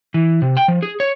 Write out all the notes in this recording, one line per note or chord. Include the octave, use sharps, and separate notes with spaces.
E3
C3
G5
F3
G#4
C#5